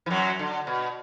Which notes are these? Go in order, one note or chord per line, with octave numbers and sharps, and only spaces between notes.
E3
F#2 F#3
D3
B2